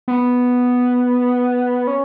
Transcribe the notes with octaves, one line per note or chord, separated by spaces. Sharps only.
B3
C#4